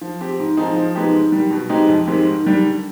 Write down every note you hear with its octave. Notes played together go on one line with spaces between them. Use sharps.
F3
C4 G4
G#2
F3 C4 D#4 G#4
F3
G#3 B3 D#4 G4
G#2
D#3 G3
B2
G#3 C4 D#4 G4
F2
D#3 G#3 C4 G4
G#2
D#3 G3 D4
D3